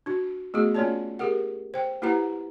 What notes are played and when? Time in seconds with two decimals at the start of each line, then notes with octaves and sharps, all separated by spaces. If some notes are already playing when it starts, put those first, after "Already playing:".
0.06 D4 F#4
0.54 A3 B3 F#4 G#4
0.75 A#3 C#4 F4 C#5 D5 A5
1.19 G4 G#4 A#4 F#5
1.74 C5 G5
2.02 A#3 E4 G4 B4 F#5 A#5